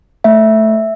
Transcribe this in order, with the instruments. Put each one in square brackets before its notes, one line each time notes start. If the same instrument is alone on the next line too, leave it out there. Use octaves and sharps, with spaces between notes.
[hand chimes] A3 E5